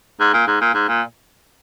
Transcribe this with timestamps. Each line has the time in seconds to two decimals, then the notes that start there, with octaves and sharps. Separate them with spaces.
0.20 G#2
0.33 A#2
0.47 G#2
0.61 A#2
0.74 G#2
0.88 A#2